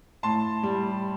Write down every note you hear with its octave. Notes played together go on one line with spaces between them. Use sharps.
A2 A5 C6
G3